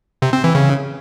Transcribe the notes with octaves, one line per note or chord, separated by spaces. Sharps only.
C3
C4
E3
C#3